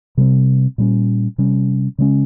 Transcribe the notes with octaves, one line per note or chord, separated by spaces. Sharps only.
C3 G3 C4
A#2 G3 C#4
C3 G3 C#4
C#3 G#3 C#4